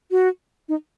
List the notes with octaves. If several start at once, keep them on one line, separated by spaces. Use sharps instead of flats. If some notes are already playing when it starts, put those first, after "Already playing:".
F#4
D#4